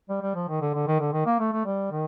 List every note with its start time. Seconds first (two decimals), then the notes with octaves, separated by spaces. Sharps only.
0.09 G3
0.22 G3
0.35 F3
0.48 D#3
0.61 D3
0.74 D3
0.87 D#3
1.00 D3
1.13 D#3
1.26 A#3
1.40 A3
1.52 A3
1.65 G3
1.91 D#3